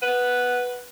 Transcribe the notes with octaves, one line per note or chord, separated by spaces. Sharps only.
B4 F#5